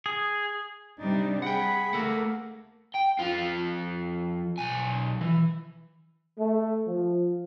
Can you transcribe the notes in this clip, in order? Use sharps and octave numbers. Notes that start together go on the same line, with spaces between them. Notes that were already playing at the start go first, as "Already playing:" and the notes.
G#4
C3 G3 D4 D#4
G#4 F#5 G5 B5
A3 A#3 A4 F#5
G5
F2 F4
B1 G#5
E3
A3
F3